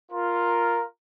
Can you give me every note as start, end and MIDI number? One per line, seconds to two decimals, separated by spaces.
0.12 0.82 65
0.12 0.82 70